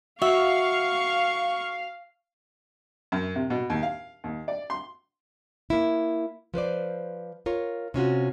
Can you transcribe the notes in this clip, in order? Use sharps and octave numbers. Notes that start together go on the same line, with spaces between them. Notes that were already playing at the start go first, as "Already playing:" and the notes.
F#4 E5 F5 C#6
F#2
C3
B2
D#2
F5
D#2
D5
C6
A#3 E4
F3 B4 C5 D5
F4 A#4 C#5
C3 C#4 F4 F#4